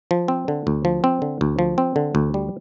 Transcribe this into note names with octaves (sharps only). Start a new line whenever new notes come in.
F3
C4
D3
D2
F3
C4
D3
D2
F3
C4
D3
D2
G3